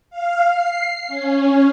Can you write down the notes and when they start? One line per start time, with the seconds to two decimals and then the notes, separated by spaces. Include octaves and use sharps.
0.10 F5
0.52 C7
1.08 C#4